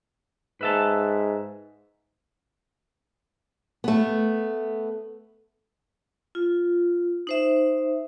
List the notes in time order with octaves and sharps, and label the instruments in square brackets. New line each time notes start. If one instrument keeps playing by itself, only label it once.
[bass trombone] G#2 [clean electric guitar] B4 E5 A5
[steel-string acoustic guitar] A3 B3
[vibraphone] F4
D#4 C5 E5